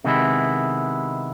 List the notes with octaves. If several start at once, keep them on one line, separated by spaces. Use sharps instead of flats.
C3 D#3 G#3 B3 E4